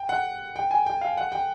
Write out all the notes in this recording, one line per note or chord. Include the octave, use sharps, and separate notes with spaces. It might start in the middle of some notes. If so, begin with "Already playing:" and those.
Already playing: G5
F#5
G5
G#5
G5
F5
F#5
G5